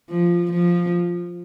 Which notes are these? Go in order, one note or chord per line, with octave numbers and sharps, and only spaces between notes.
F3
F3